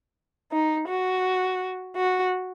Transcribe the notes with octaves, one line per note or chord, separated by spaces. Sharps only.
D#4
F#4
F#4